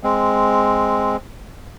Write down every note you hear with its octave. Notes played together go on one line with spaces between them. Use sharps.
G#3 C4